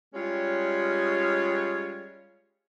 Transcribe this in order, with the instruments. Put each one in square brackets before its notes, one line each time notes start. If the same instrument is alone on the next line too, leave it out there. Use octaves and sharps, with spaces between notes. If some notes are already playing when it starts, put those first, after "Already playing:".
[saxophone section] G3 G#3 C#4 F4 C#5